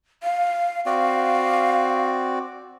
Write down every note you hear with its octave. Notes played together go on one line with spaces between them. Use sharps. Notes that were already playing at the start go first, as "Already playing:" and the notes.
F5
C4 F#4 D5 F5